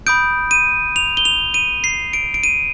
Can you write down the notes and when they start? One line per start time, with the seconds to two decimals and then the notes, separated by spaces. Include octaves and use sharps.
0.07 B5 D#6 G6 D7
0.51 D#7
0.96 F7
1.17 G7
1.25 F7
1.54 D#7
1.84 C7
2.13 D7
2.34 D7
2.44 D#7